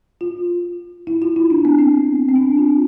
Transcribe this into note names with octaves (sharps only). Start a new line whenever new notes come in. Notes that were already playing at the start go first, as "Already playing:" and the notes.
F4
E4
F4
E4
D4
B3
C4
C4
D4
F4